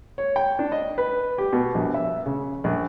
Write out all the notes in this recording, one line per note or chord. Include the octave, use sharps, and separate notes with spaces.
C#5
G5
D4
D#5
B4
G4
B2
A#1
E5
C#3
A#1